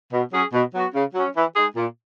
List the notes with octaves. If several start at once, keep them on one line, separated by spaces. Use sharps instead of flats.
B2
F#3 C#4 G#4
B2
F#3 B3 F#4
C#3
F#3 C#4
E3
G#3 D#4 G#4
A#2